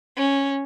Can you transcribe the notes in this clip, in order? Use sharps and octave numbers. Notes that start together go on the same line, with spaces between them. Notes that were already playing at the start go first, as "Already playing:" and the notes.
C#4